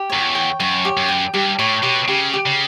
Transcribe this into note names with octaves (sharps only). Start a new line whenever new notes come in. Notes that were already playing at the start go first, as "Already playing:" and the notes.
Already playing: G4
F#2 C#5
E2
G5
F#2 C#5
G4
F#2
G5
G2 G4
A2 C#5
B2 G4
C#3 G4
G4
C#3